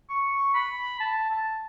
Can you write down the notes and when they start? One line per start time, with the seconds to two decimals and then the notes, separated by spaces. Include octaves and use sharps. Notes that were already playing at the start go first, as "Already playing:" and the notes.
0.09 C#6
0.54 B5
1.00 A5
1.30 A5